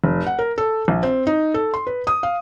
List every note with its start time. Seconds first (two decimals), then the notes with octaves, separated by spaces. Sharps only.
0.04 F1
0.27 F#5
0.39 A#4
0.58 A4
0.88 A#1
1.03 C4
1.27 D#4
1.54 A4
1.74 C6
1.87 B4
2.07 D#6
2.23 F5